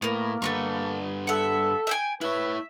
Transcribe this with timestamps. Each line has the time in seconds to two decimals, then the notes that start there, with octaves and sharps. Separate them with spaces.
0.02 A2 A#3 B3 A#4
0.42 G2 A3 B3 C4 C#6
1.27 A4 E5 F#5
1.87 E5 G5 G#5
2.21 E4 B4 C#5 E5